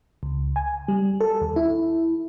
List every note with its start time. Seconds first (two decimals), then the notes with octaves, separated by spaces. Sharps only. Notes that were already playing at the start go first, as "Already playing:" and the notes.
0.23 C#2
0.56 G#5
0.88 G3
1.21 A4
1.41 D#2
1.56 E4